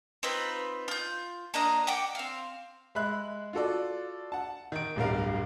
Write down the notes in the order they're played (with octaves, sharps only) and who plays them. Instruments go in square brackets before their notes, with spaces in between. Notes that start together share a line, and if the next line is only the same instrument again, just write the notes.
[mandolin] C4 D#4 F4 B4
F4 G6
A#3 D4 D#5 A#5
F#5 G5 D6
C4 F5
[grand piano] G#3 E5 B5 F#6
F4 F#4 A4 D5
F#5 A5
D#3 D7
D1 B1 G2 G3 A#4 F5